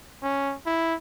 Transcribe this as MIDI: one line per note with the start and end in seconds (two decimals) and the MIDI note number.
0.23 0.55 61
0.66 0.95 64